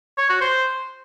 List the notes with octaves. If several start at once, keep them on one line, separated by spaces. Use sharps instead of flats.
C#5
F#4
C5